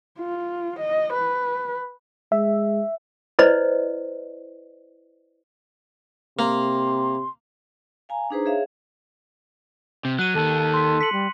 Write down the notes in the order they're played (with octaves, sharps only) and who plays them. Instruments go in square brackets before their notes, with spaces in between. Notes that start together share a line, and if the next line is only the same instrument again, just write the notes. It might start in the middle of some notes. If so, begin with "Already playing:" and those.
[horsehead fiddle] F4
D#5
B4
[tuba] G#3 [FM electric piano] E5
[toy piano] E4 B4 C5 D5 D#5
[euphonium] C3 [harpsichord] A#3 [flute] C6
[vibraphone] F5 G#5 A#5
D4 D#4 G#4 B4 C5 A#5
G#4 C#5 E5 F5
[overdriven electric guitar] C3
[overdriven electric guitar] F#3 [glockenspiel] F#6 D#7
[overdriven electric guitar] D#2 D#3 [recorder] A4
[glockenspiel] C6 B6
B6 C#7 F#7
[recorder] G3